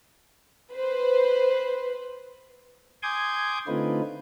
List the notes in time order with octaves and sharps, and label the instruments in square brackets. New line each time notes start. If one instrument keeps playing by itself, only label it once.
[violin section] B4 C5
[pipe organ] G#5 C6 D6 D#6 G6 G#6
D3 A3 C4 D#4 F4 B4